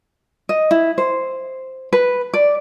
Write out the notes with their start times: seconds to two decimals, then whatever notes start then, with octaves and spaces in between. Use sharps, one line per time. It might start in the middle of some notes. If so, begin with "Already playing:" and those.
0.49 D#5
0.71 E4
0.98 C5
1.93 B4
2.34 D5